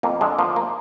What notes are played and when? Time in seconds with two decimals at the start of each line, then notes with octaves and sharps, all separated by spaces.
0.03 F2 A#3
0.21 D3 G#3
0.39 F3 A#3
0.56 A#3